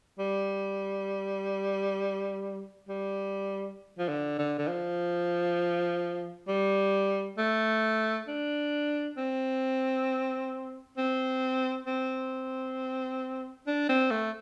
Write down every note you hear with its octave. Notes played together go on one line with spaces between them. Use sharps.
G3
G3
F3
D3
D3
D3
F3
G3
A3
D4
C4
C4
C4
D4
C4
A3